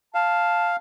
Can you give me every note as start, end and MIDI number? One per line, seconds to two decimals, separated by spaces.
0.15 0.76 77
0.15 0.76 81